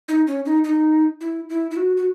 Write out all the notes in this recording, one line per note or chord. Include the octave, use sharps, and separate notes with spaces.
D#4
C#4
D#4
D#4
E4
E4
E4
F#4
F#4